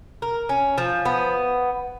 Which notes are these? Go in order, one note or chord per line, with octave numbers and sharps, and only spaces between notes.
A#4
C#4
F3
B3